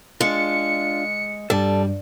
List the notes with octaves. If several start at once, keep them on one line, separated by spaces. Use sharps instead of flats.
G#3 D4 F4 C#7
G2 G3 A4 D5 A5